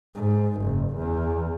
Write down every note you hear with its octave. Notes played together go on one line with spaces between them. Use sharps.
G#2
F#1
E2